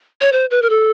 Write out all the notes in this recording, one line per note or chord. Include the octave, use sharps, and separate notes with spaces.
C#5
C5
B4
A#4
A4